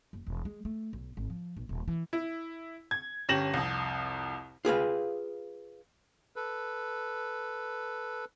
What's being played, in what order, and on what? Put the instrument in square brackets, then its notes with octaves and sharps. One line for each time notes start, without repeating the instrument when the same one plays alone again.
[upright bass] F#1
E1
G#3
A3
B1
G#1
F3
A#1
D#1
E3
[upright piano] E4
G#6
G1 C#4 G4 A#6 E7 F#7
C2 F2
[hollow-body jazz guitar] F4 G#4 B4 F5
[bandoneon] A4 B4